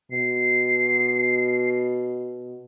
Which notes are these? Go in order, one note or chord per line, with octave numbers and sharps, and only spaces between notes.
B2 C7